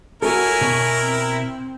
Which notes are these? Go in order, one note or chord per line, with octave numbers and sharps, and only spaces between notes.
E4 F#4 A4 A#4 C#5 G#5
B2
C4